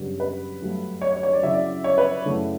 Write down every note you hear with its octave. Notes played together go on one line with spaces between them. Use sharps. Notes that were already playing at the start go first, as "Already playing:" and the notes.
Already playing: F#2 C#3 G3 B3 D4
B4
G2 F#3 A3 D4
C#5
C#5
C#5
D5
C#3 F#3 C#4 E4 E5
D5
C#5
B4
F#2 C#3 F#3 A3 E4